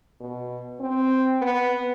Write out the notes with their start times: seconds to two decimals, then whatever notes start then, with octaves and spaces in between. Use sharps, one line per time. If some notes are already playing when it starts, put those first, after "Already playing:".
0.20 B2
0.80 C4
1.42 B3